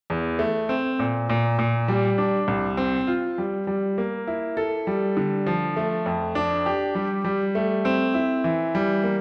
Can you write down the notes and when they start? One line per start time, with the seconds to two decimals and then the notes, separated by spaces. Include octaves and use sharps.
0.10 E2
0.39 A3
0.69 C4
0.99 A#2
1.30 A#2
1.59 A#2
1.88 G3
2.18 D4
2.48 C2
2.77 C4
3.07 F4
3.38 G3
3.67 G3
3.98 A#3
4.27 E4
4.57 A4
4.87 G3
5.17 D3
5.47 F3
5.77 A3
6.06 F2
6.35 D4
6.66 G4
6.95 G3
7.25 G3
7.55 A3
7.85 C4
8.14 E4
8.44 E3
8.75 G3
9.03 A#3